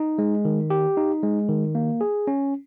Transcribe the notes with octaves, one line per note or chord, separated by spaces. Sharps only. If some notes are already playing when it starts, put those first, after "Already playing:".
Already playing: D#4
G#3
D#3
G4
D#4
G#3
D#3
A#3
G#4
C#4